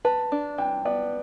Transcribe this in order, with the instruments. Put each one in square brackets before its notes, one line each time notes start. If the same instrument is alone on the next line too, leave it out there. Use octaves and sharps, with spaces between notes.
[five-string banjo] B4 [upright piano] A5
[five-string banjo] D4
[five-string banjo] E3 [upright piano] G5
[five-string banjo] B3 [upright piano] D5